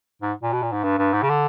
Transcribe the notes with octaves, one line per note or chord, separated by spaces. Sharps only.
G#2
A#2
B2
A#2
G#2
G2
G2
G#2
C#3
D3